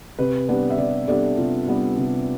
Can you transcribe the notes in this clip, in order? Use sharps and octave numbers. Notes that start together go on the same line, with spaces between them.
C3 B4
G3 B3 D4 B4
E5
C3 D5
G3 B3 D4 A4
C3 F4
G3 B3 D4
C3